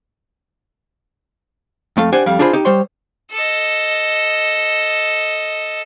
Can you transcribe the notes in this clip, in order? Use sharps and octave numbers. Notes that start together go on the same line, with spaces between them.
F2 A3 F5
D4 G4 C5 F#5 G#5
F2 G3 F5
D4 F4 G#4 C5 B5
D#4 G4
G3 C5 C#5 C6
A4 D#5